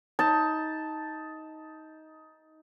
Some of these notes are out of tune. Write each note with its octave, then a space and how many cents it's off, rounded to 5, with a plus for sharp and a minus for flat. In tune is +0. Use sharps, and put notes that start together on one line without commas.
D#4 +15 A5 +0